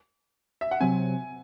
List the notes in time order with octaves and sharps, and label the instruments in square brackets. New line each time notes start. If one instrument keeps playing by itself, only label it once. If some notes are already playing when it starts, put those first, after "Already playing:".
[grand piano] E5
F#5
[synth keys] C3 F#3 C4 [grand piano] G#5